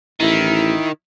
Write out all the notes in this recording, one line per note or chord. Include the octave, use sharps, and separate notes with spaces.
A1 D#3 E4